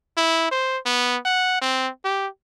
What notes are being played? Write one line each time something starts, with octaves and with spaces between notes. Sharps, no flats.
E4
C5
B3
F#5
C4
G4